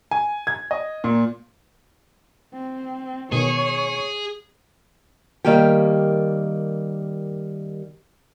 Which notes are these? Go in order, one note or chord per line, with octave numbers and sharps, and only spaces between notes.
G#5
G#6
D#5
A#2
C4
B2 D#3 G#4 C#5
D#3 G3 A#3 G4 G5